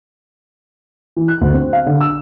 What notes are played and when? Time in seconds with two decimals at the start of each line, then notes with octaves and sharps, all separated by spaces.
1.16 E3
1.28 F#6
1.41 D2
1.53 C4
1.73 F5
1.86 D3
2.01 E6